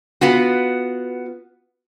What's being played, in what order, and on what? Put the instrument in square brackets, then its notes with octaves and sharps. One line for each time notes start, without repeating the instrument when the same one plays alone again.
[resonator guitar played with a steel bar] B3 F4 F#4